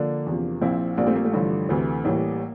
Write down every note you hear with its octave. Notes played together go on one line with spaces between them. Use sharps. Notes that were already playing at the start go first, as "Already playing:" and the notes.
Already playing: D3 F3 A#3 D4
E2 C3 F3
A#1 A#2 F3 C4 E4
A#1 A#2 G3 A#3 D4
A3 C4
A#3
A3
A1 G2 D3 F3
D2 C3 E3 A3
A1 A2 E3 G3 A#3